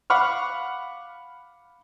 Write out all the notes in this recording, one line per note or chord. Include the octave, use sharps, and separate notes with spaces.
F5 F#5 B5 C#6 D6 F6